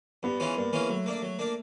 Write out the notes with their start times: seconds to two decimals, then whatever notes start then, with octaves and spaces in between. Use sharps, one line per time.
0.23 G2 B3
0.40 E3 G#3 C#4 F4
0.56 G2 A#3
0.73 E3 G#3 C#4 F4
0.89 F#3 A3
1.06 A#3 D4
1.22 F#3
1.39 A#3 D4